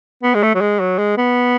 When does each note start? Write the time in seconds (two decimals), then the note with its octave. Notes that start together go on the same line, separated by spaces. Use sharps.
0.23 B3
0.34 G#3
0.43 A3
0.55 F#3
0.61 G#3
0.80 F#3
0.98 G#3
1.17 B3